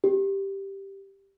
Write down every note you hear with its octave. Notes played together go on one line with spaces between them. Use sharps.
G4